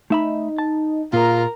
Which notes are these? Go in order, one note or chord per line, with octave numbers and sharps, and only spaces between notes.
A3 D#4 E5 B5
A5
A#2 F4 G#4 A#4 A#5